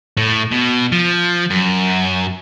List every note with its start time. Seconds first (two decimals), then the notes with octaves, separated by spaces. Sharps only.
0.17 A2
0.51 B2
0.92 F3
1.51 F#2